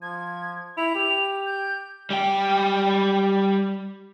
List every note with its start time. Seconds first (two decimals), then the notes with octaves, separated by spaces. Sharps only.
0.02 F3 G#6
0.77 E4 F7
0.95 G4
1.46 G6
2.10 G3 G5